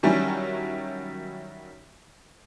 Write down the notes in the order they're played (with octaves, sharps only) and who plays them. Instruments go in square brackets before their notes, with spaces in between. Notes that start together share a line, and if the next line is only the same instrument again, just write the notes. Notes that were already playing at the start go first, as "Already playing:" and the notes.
[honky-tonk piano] D#3 F#3 G3 C#4 E4